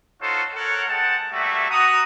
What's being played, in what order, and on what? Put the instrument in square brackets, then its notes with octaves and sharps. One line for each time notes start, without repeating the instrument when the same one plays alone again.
[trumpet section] D#4 F4 F#4 A4 C5 C#5
A4 A#4 C#5 F#5
G#3 F#5 G5 A5
G3 A3 A#3 F#4 E5
F#4 A#5 D#6